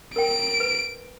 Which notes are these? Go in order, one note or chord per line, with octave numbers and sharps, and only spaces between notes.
A#4 C#5 G5 D7
B4